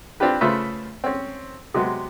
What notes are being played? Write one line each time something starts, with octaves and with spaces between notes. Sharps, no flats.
C4 D4 F4 G4 B4
C#3 A3 F4 B4 C5 E5
C4 C#4
C3 F#3 G#3 B3